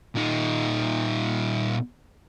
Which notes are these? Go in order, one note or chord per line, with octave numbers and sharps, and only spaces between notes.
A#2 D#4